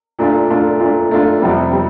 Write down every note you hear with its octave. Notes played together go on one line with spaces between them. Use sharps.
A#2 A3 D4 F4
A#2 A3 D4 F4
A#2 A3 D4 F4
A#2 A3 D4 F4
F2 C3 G3 C4
G3 C4